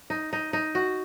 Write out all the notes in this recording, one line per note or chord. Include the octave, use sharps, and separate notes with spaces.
D#4
D#4
D#4
F#4